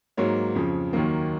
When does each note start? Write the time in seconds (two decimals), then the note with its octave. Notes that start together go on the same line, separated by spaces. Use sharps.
0.17 G#2 F#3 A#3 C#5
0.55 F2 C#3 F3
0.93 D#2 D#3 F#3 A#3